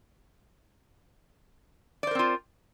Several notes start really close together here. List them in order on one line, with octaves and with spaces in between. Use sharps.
D5 C5 A#4 C4 F4